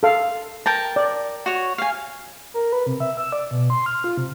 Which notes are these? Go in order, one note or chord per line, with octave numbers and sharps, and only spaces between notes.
A4 F5
A#4 G5 A5
D5
F#4 C#5
F5 G#5
A#4
B4
C3
E5
E6
D5
B2
C6
F6
F4
C3